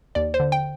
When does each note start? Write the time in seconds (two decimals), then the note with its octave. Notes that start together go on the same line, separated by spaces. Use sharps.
0.15 D#2 D5
0.34 C5
0.40 D3
0.52 G5